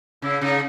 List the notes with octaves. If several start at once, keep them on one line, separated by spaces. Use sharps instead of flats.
C#3 E4
C#3 D#4